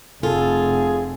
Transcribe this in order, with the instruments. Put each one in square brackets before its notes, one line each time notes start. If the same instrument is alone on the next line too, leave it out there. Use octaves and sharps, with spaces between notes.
[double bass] F1 [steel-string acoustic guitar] F4 [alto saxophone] G#4 [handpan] A4